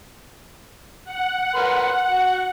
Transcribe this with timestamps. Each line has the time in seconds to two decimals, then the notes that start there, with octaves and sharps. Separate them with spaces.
1.05 F#5
1.55 A#4 B4 C6
2.10 F#4